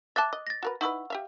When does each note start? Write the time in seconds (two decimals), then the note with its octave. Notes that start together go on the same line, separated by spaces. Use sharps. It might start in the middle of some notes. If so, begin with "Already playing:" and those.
0.16 E5 G5 A5 D6 F#6 A6
0.33 D#5
0.47 A6 A#6
0.63 F#4 A#4 B4
0.81 D#4 E4 B4 F#5 C#6 E6
1.10 G4 E5 F5